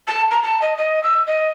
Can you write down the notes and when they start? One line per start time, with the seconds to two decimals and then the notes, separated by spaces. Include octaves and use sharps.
0.07 A5
0.31 A#5
0.43 A5
0.62 D#5
0.77 D#5
1.03 E6
1.27 D#5